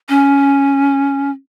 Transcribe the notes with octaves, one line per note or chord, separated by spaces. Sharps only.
C#4